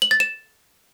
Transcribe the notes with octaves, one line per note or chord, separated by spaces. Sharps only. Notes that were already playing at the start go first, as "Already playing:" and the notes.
F#7
A6
E7